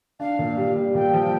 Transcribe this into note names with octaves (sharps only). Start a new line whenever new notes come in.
D4 F5
A#2
G3
G3
A#2 G5
F3